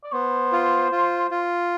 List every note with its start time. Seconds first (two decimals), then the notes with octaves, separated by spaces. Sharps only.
0.04 D5
0.13 B3 C5
0.52 F4
0.92 F4
1.31 F4